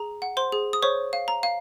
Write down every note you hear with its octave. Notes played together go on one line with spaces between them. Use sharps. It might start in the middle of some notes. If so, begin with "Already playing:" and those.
Already playing: G#4 A#5
F#5
C5 C6
G#4
D#6
C5 C#5 C#6
F5
A#5
F5